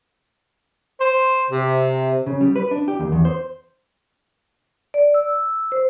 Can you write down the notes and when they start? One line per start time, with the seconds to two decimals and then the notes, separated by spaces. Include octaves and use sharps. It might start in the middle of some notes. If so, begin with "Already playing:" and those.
1.00 C5
1.50 C3
2.26 C#3
2.41 G3
2.56 B4
2.71 D4
2.88 G4
2.99 D#2
3.12 E2
3.25 C5
4.94 D5
5.14 E6
5.72 C5